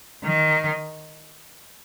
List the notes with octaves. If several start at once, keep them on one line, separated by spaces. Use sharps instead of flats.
D#3